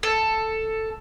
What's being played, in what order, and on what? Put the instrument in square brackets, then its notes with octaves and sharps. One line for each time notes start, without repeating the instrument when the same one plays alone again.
[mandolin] A4